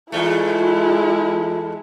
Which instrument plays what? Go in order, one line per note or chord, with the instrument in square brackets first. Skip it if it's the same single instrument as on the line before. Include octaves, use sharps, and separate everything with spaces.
[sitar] E2 A3 [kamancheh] G#3 E4 [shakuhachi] F4